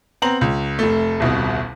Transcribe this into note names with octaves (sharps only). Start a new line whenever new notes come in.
B3 C4 A#5 F#7
C#2
F1 A3
D#1 C2 B2